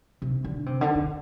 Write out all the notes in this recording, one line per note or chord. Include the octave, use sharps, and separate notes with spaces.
C3
D3
C3
D3
D3